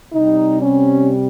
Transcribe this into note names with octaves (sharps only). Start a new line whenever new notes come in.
C3 G3 D#4
C#4